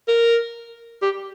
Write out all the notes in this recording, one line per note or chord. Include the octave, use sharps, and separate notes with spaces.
A#4
G4